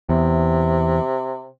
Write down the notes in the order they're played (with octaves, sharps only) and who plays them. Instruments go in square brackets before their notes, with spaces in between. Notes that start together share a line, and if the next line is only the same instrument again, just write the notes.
[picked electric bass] E2 [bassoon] C3